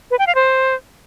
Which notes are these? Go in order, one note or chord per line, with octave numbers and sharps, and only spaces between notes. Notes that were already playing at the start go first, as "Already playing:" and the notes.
B4
G5
F5
C5